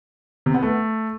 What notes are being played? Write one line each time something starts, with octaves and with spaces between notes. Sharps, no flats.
C3
B3
A3